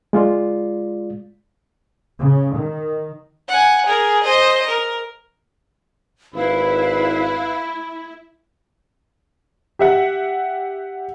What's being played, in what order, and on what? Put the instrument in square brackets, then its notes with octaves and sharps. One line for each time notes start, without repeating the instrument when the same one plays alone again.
[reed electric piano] G#3 F4 D5
[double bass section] C#3
D#3
[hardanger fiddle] F#5 G#5
G#4 A#4
C5 D#5
A#4
[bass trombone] G#1 [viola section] E4 [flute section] B4 F5 [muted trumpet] B5
[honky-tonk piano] G4 E5 F#5